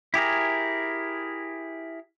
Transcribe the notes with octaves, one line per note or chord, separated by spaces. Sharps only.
E4 G4 G#4 A#4